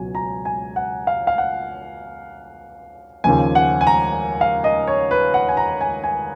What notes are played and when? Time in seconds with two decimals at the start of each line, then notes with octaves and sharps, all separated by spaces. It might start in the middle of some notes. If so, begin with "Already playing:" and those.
Already playing: C#2 B2 F#3 G#5
0.15 A#5
0.45 G#5
0.76 F#5
1.07 F5
1.27 F5
1.38 F#5
3.24 D#2 C#3 F3 G#5
3.55 F#5
3.81 G#5
3.87 A#5
4.41 F5
4.64 D#5
4.87 C#5
5.11 B4
5.34 F#5
5.49 G#5
5.57 A#5
5.81 G#5
6.04 G#5